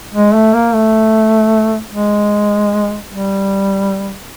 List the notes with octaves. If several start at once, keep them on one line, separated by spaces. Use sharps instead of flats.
G#3
A3
A#3
A3
G#3
G3